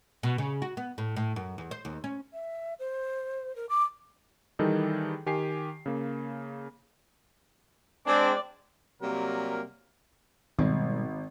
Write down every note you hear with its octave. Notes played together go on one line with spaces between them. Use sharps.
B2
C#3
F#4
B3
A2
A2
F#2
E2
C5
D#2
C#4
E5
C5
A#4
D6
D#3 E3 G3 D#4 G#4 A4
D#3 G4 G#5 C7
C#3 A#3
G#3 C4 D4 D5
C3 F#3 G3 A#3 A#4
G#1 B2 G3 G#3